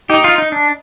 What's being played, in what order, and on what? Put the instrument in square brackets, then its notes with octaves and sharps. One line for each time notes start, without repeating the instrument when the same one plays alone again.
[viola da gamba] D#4 [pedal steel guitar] G4
[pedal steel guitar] F4
D#4
D4